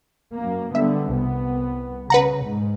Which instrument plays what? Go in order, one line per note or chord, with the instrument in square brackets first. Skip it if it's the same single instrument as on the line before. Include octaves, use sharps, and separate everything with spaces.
[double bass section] F#2 A#3
[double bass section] D3 G3 B3 [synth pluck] E5
[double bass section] C2 B3
[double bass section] C#3 [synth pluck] B4 F#5 A#5
[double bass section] G#2